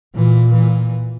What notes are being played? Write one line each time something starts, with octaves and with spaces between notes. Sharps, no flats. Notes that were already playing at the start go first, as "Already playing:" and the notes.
A#2 E3
E3